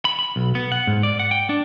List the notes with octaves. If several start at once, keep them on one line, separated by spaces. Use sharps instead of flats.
B5
B5
B1
B3
F#5
G#2
D5
F#5
G5
D4